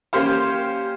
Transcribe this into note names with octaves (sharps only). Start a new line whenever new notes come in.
A#3 C#4 G4 C5 F5